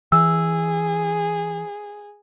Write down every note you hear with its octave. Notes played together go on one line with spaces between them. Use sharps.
E3 G#4 E6